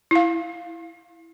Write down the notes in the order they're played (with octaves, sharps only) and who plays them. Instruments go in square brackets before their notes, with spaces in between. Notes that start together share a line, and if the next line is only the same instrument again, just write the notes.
[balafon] E4 F5